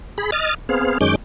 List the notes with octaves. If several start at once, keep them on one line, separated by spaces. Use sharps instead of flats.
G#4 B5
D#5 F6 A6
B3 C4 G#4 F5
F#2 D#3 G#3 C#4 D6 G6